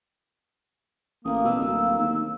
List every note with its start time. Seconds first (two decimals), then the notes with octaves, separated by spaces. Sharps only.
1.24 A1 A#3 D#6
1.44 B2 E6
1.59 D1 A#3
1.98 D#2